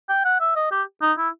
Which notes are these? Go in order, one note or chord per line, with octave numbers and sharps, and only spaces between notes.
G5
F#5
E5
D#5
G4
D#4
E4